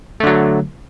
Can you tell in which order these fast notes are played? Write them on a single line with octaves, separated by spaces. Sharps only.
A3 D3 F#3